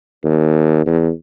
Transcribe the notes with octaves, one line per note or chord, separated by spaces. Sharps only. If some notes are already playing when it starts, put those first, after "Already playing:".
D#2
E2